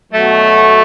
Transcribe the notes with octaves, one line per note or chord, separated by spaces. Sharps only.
B2 F#3 A3